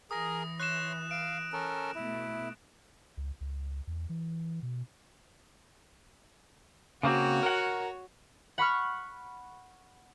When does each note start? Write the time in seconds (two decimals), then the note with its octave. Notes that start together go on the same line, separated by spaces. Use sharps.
0.11 E3 G#4 A#4 D#6 A#6
0.60 C#5 C6 F#6 E7
1.11 F5 D7
1.53 C#4 A4 A#4
1.95 B2 A3 E4
3.17 C#2
3.41 C#2
3.87 E2
4.09 E3
4.62 B2
7.03 C#3 A#3 C4 F#4 C#5
7.43 A#4 F#5
8.58 F#5 B5 C#6 F6